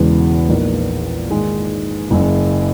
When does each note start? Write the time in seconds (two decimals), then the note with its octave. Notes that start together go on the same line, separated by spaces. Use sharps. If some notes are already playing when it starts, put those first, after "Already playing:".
Already playing: E1 E2 C#3 G#3 B3
0.49 A#1 A#2 A#3 D#4
1.30 G#2 D#3 G#3
2.10 F#1 F#2 C#3